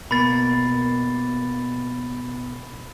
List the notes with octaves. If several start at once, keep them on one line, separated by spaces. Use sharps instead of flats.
B2 A#3 B5 A6